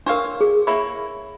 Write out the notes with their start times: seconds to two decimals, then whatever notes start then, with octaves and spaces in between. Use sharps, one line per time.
0.06 D4 A#4 C5 C#5 F5
0.41 G#4
0.67 A#3 E4 C#5 B5